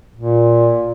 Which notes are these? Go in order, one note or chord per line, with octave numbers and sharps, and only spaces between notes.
A#2